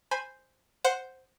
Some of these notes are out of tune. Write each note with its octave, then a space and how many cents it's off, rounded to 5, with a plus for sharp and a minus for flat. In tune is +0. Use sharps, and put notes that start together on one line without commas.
C5 +0 G#5 -10 B5 +0
C5 +0 F#5 +0